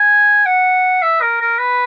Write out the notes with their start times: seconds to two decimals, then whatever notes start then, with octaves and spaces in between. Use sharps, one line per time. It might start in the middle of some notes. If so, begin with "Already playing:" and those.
Already playing: G#5
0.46 F#5
1.02 E5
1.22 A#4
1.41 A#4
1.59 B4